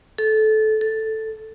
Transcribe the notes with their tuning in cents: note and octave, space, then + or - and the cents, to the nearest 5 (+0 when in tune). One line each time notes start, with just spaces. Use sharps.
A4 -20
A4 +0